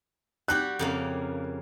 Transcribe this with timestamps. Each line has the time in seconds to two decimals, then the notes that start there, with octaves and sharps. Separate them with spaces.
0.48 G3 F#4 G4 F#6
0.79 F2 C#3 A#3